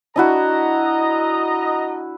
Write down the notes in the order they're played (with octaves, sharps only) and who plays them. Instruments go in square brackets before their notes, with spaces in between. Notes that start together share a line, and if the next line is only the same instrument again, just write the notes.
[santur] D4 E4 F#4 [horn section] D#5 A#5